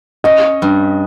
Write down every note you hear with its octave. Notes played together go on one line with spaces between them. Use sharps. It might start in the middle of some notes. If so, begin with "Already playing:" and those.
C#4 D#5
G2